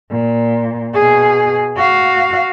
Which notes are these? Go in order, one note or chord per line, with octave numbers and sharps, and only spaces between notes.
A#2
B2 G#4
F#4 F5